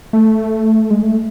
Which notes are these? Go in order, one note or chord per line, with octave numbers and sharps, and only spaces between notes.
A3
G#3
A3